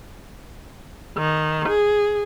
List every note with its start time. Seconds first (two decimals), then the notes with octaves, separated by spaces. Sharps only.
1.17 D#3
1.69 G#4